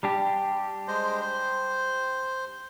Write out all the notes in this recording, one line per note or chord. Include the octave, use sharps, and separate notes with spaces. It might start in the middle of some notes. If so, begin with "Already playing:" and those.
G3 D4 G4
G#3 C5
C5